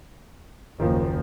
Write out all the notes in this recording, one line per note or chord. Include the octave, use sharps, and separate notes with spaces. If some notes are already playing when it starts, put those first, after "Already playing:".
F#1 D#2 D#3 F3